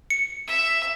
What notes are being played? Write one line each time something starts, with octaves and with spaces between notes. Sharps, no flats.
C#7
E5